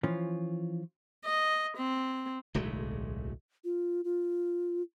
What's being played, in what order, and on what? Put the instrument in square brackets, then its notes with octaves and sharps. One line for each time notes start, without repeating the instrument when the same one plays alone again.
[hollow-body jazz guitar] E3 F3 C#4 F4
[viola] D#5
C4
[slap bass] D1 B1 G#3 A3
[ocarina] F4
F4